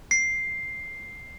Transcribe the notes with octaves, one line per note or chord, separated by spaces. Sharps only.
C7